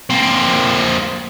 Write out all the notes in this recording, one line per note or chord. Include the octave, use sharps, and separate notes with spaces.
A#3 C4